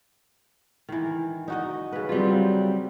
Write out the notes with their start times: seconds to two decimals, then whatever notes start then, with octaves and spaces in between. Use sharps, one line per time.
0.89 D#3 E3
1.48 D#4 F#4 D#5
1.93 C#3 B4
2.09 F#3 G3 C4 F4